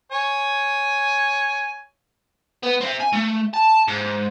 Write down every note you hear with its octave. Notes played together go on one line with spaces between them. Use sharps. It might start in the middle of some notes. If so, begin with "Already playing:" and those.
C#5 G#5
B3
C4 E5
G#5
A3
A5
G#2